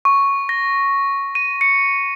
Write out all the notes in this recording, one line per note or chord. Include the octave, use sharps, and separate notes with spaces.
C#6
A#6
D#7
C#7